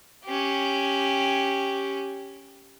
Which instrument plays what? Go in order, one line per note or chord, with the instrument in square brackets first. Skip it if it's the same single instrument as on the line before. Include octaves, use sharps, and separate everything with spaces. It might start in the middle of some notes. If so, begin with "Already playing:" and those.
[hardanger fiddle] C#4 G4